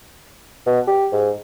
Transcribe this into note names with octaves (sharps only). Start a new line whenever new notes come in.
B2
G4
G#2